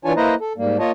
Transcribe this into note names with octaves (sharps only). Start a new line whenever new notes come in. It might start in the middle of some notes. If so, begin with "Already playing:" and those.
E3 D4 F4 C#5 G#5 A5
A#3 E4 B4 C5 D#5 A#5
A4
G#2 G3 A#3
A#3 F4 C#5 D#5 A5